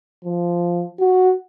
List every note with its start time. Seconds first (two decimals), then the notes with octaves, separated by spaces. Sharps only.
0.24 F3
0.99 F#4